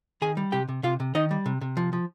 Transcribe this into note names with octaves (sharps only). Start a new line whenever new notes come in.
D#3 G#4 G#5
G3
C3 G4 G5
C3
C3 F4 F5
C3
D#3 D#4 D#5
G3
C3
C3
F3
F3